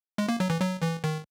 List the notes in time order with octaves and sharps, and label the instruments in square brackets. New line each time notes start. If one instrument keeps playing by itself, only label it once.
[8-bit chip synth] G#3
A#3
F#3
E3
F#3
E3
D#3